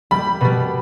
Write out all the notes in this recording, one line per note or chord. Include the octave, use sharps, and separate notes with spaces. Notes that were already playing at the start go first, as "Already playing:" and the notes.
G3 B5
B2 G3